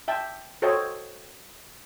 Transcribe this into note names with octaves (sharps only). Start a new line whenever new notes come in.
E5 G5 A5
F#4 A4 C5 C#5 D#5 G5